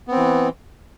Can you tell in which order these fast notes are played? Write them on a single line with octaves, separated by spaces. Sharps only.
B3 C4 E3